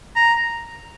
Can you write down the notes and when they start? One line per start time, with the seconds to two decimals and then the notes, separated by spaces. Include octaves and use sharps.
0.16 A#5